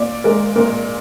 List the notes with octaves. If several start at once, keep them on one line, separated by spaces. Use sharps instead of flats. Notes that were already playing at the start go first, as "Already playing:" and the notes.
Already playing: A#2 D5
G#3 A#4
A#2 A#4